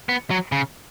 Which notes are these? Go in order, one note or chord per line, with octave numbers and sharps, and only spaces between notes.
B3
F#3
C#3